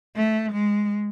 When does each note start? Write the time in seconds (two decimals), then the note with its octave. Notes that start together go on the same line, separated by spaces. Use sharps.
0.16 A3
0.52 G#3